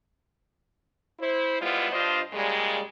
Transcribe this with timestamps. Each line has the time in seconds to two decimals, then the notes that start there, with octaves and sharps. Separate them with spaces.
1.19 E4 C5
1.61 G3 G#3 B3 E4 F4
1.91 G2 D4 F4 C5 D#5
2.32 A#2 C#3 G3 G#3